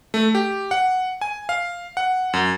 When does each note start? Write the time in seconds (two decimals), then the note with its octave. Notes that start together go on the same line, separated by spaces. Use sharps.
0.14 A3
0.35 G4
0.71 F#5
1.21 G#5
1.49 F5
1.97 F#5
2.33 F#2